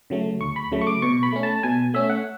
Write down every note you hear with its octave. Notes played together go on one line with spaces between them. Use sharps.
C#3 F#3 A3
D2 C#6
B5
C#3 F#3 A3
C#6
D6
B2 C#6
B5
A3 C#4
A5
B2 G#5
A3 C#4 E5
F#5